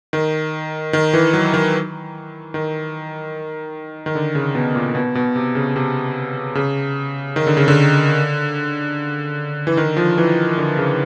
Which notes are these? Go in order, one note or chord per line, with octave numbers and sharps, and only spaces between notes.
D#3
D#3
E3
F#3
D#3
D#3
D#3
D3
C#3
B2
A#2
B2
B2
C3
C#3
C3
C#3
D#3
D3
C#3
D3
E3
D#3
F3
E3
D3
C#3